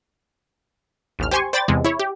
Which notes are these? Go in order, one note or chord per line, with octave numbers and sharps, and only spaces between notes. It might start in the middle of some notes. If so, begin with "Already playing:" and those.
A1 D#2 F6
G4 C5 G#5 C6 C#6
C5 D5 G5 B5 A6
E2 C3 G#3
E4 C#5
G4